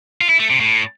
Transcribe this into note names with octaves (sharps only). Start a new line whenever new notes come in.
F4
E4
A3
C3
A2